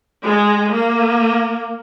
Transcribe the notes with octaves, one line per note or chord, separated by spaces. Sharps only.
G#3
A#3